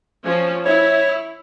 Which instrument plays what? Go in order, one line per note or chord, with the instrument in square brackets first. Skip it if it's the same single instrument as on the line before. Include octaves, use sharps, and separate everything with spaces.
[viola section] F3 C#4
[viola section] E4 [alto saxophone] C#5